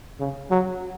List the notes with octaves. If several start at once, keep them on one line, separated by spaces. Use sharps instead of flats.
C#3
F#3